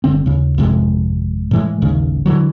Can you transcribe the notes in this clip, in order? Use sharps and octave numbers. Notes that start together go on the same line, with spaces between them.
G1 D3 C4
D#2 C#3
G#1 F2 C3 G#3
A2 E3 G#3
D#1 A1 D#2 C#3
D3 E3 F#3